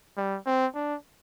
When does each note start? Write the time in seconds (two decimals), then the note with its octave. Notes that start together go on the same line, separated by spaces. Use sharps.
0.17 G3
0.46 C4
0.75 D4